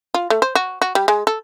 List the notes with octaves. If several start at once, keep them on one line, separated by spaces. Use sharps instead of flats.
F4
A3
C5
F#4
F#4
G3
G#3
A4